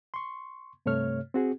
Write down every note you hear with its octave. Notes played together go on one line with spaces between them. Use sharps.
C6 C#6
G2 C3 A3 C#5 F6
C4 F#4 G#4